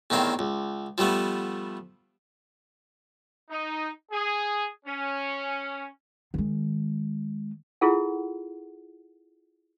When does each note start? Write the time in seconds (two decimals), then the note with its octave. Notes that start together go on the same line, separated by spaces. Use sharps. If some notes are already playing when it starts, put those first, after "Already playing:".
0.10 E2 A2 D#3 C4 F5
0.39 C#2
0.98 F3 G3 A3 B3
3.50 D#4
4.11 G#4
4.86 C#4
6.34 D#3 G#3
7.81 E4 F4 G#4 A4 F#5